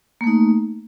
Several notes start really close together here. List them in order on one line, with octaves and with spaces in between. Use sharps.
A#3 A3 D#4